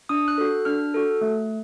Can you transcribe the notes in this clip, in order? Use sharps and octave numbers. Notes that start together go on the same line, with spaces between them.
D4 D#6
F#6
F#4 A4
D4 F6
F#4 A4
A3